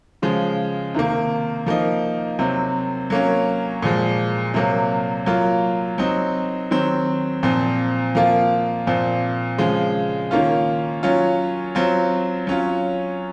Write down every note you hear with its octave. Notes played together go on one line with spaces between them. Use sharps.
C#3 F3 G#3
C3 D#3 A#3
F3 A#3 D#4
C3 F#3 C4
F#3 A#3 C#4
A#2 F3 G#3
C3 F#3 A#3
F#3 A#3 F4
F#3 C4 D#4
D#3 F#3 C4
A#2 F3 C4
F3 A#3 F4
A#2 F3 C4
C#3 F3 G#3
D#3 A#3 C#4 F4
F#3 C#4 F4
F#3 C4 F4
F#3 C#4 F4